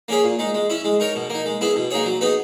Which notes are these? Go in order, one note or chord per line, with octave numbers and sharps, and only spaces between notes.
A#3 C#4 G#4 C#5
A#2
G#3 D#4
G#3
C#4 E4
G#3
D#4 A#4 C#5
B2
A#3 D#4
G#3
B3 E4 G#4
B2
A#3 D#4 G#4 C#5
F#3
B3 D#4 G#4 B4